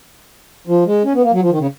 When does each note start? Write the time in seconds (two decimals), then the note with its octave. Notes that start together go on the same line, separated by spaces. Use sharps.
0.67 F3
0.86 G#3
1.04 C#4
1.14 B3
1.23 A#3
1.32 F#3
1.42 F3
1.50 D#3
1.58 C#3